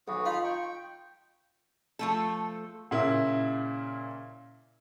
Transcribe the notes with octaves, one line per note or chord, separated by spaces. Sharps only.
B1 F#4 G#4 B4
D#4 F4 B5
G5 C#6
G5
F3 A3 A4
A#2 C#3 E4